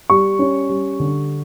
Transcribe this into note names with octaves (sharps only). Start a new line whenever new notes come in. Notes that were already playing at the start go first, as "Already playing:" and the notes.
G3 C#6
C#4
G3
D3